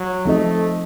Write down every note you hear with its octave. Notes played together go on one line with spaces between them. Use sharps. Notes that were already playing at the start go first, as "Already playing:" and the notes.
Already playing: F#3
F3 A3 C4 D#4 A4 D#5